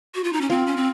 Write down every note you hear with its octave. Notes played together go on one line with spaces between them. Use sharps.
F#4
F4
D#4
C#4
C4 F4
C#4
C4